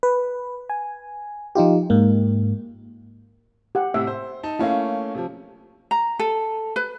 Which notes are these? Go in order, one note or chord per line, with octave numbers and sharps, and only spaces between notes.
B4
G#5
F3 D#4 F4 G4
G#2 A#3
G4 F#5
A2 C3 E5
C5
D#4 A5
A3 A#3 C#4 E4 F5
C3 F3
A#5
A4
B4